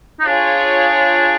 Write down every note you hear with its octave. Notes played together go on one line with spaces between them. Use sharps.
D#4
D4 F4 G#4 C#5